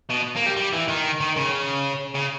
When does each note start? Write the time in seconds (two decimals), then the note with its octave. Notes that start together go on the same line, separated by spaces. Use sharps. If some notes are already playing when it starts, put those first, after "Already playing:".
0.10 B2
0.36 A#3
0.46 G3
0.57 G3
0.73 E3
0.88 D#3
1.20 D#3
1.36 C#3
2.15 C#3